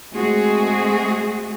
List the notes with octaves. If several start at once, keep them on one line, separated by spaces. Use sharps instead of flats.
G#3 A3 C4 F#4 G#4